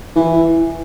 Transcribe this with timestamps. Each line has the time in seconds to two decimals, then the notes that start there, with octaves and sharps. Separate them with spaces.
0.16 E3